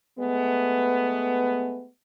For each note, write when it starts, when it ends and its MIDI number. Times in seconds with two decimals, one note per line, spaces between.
0.18 1.86 56
0.18 1.86 57
0.18 1.86 59